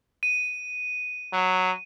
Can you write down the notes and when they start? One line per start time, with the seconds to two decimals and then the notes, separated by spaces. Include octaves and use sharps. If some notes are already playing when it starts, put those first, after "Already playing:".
0.23 D#7
1.33 F#3